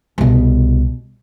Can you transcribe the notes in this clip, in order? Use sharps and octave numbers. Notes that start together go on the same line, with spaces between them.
C2 B2